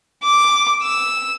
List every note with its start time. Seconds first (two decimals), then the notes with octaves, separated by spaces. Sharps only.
0.24 D6
0.83 E6